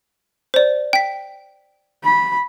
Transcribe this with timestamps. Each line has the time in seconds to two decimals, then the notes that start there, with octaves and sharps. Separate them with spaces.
0.54 C5 D5
0.93 G5 B6
2.04 B5